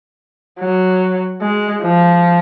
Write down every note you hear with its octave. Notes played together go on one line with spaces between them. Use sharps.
F#3
G#3
F3